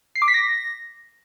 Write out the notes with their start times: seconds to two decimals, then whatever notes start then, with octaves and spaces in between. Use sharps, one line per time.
0.16 C7
0.22 D6
0.28 B6
0.34 A#6